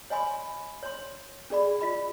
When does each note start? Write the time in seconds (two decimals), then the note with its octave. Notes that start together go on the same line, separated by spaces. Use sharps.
0.10 C#5 D#5 G#5 B5 C6
0.83 C#5 C6
1.50 C#4 G#4 D5 B5
1.81 F4 D#5 B5